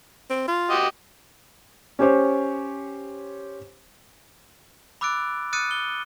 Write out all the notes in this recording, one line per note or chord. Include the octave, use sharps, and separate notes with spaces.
C4
F4
F#4 G4 D#5
C#4 G4 C5 C#5
B5 D6 E6 F#6 A6 D7
D#6 F6 F#6 A6 C#7 D#7
G7